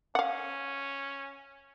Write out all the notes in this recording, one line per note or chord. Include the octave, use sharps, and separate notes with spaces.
C#4 F5 F#5